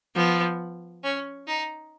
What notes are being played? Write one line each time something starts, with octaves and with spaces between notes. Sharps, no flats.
F3 B3
C#4
D#4